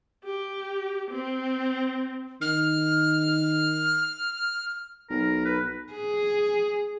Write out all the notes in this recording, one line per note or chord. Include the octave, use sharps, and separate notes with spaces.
G4
C4
D#3 F6
B1 A#4
B4
G#4